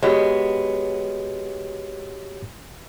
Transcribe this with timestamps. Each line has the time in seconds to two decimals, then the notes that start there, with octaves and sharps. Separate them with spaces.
0.03 G#3 B3 F#4 G4 C#5